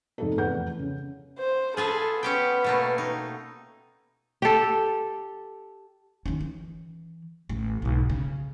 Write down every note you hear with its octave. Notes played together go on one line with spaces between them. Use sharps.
F1 D#4 A4
F1 E2 B4 F#5 G6
C#3
C5
F4 G#4 A4 B4
B3 C#4 G4 G5
B2 A3 A#3
D#4
G4 A4
D#3 C#4
E3
A1
B1 G#2
C#3